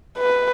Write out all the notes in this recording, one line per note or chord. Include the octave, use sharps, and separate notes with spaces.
B4